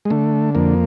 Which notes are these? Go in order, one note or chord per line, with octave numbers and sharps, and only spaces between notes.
G#3
D3 A3
F2 A#3